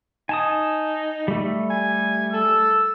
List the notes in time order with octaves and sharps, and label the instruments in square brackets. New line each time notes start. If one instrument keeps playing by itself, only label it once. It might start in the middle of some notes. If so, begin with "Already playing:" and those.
[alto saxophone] D#4 [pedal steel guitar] G#5 A5 D#6
[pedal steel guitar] G3 A3
[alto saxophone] G#5
[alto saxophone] A4 [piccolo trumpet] E6